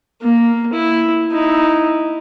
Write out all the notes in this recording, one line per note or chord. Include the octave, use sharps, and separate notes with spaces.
A#3
E4
D#4 E4